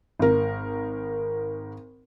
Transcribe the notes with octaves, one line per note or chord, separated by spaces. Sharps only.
G#1 A#4